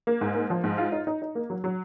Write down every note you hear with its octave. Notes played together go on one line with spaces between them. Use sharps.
A#3
G#2
A#3
F3
G#2
F4
D#4
D#4
D#4
A#3
F#3
F#3